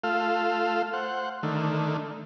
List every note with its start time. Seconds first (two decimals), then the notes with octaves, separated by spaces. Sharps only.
0.04 A3 F4 A4 F5
0.93 C5 F#5
1.43 D3 D#3 A3